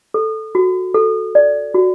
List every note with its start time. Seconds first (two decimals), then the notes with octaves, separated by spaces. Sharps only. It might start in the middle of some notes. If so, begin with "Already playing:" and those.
0.14 A4
0.55 F#4
0.94 A4
1.35 D5
1.74 F#4